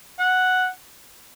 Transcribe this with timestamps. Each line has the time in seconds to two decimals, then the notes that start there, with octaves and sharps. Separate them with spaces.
0.19 F#5